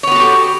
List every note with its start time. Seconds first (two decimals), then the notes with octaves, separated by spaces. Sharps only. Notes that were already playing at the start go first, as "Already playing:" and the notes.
0.03 C#5
0.07 B3
0.11 F#4
0.16 A4
0.20 G4